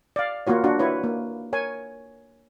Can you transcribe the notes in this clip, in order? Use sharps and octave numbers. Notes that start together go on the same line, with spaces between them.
D5 F5
A#3 F4 F#4 C#5
D4 F#4
E4 B4 C#5
A#3
A#4 C#5 G#5